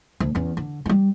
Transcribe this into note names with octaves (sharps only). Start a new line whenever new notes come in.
D2
E2 C#4
D3
F#3 G3